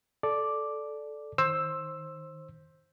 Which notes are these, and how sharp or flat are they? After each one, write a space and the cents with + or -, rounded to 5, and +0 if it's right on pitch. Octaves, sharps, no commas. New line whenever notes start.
A4 -10 D5 +0 D6 +0
D#3 +0 C5 +20 E6 +0